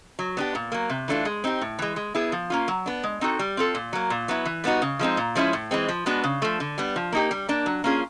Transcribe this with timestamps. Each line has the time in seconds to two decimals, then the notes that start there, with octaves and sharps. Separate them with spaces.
0.19 F#3
0.37 B3 D4 G4
0.55 A#2
0.72 F#3 A#3
0.90 C3
1.08 E3 A3 D4 F4
1.25 G#3
1.44 C4 D#4 G4
1.61 A2
1.79 E3 G#3
1.96 G#3
2.15 B3 E4 G#4
2.32 F3
2.50 A#3 C#4 F4
2.68 F#3
2.86 B3 D4
3.03 G#3
3.21 C4 D#4 F#4 A4
3.39 G3
3.57 C4 F4 A4
3.75 A#2
3.93 F#3 A#3
4.10 A#2
4.28 F#3 B3 E4
4.45 E3
4.64 G3 B3 D#4 F#4
4.82 C#3
4.99 F3 G#3 C4 D#4
5.17 A#2
5.35 F3 G#3 C#4 E4
5.53 A2
5.71 E3 G#3 C4
5.89 F3
6.06 G#3 B3 D4 F#4
6.24 C#3
6.42 F3 A3
6.60 D3
6.78 G3 B3
6.96 F3
7.12 A#3 D#4 G4
7.31 G3
7.49 A#3 D4
7.66 F#3
7.84 A#3 C#4 F4 G#4